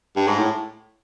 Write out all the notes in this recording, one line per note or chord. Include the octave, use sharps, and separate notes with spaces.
G2
G#2
A2